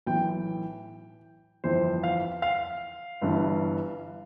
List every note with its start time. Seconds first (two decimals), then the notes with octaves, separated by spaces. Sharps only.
0.07 B1 A2 E3 G5
1.64 G1 F2 E3 C5
2.04 F5
2.42 F5
3.21 G1 G2 E3